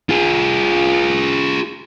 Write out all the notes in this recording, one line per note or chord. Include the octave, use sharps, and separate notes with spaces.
F4 G#4